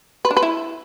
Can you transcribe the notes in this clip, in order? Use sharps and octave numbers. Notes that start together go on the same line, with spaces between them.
B4
D4
B4
E4